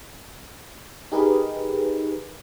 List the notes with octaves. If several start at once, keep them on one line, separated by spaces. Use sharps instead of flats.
D#4 G4 G#4 A#4 B4